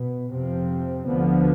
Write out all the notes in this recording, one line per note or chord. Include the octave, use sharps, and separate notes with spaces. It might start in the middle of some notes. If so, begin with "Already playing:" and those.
Already playing: B2 B3
F2 C3 F3 C4
D2 D3 F3 B3